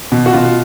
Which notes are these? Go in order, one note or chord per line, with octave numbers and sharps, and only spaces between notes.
B2
F#4
B2 F4